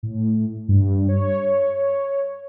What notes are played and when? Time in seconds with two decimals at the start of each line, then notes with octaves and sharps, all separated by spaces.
0.03 A2
0.68 G2
1.08 C#5